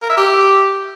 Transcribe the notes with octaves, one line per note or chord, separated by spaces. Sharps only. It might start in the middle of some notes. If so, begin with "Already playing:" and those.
A#4
E5
G4